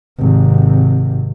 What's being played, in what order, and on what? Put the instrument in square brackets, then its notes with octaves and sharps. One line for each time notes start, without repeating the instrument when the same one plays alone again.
[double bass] G#1 C3